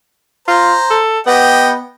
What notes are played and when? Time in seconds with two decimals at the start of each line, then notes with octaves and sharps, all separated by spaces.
0.48 F4 C5 A#5
0.91 A4
1.27 B3 G4 D#5 G5